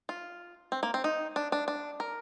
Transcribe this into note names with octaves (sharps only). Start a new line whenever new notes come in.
F4
C4
A#3
C4
D#4
D4
D4
D4
A#4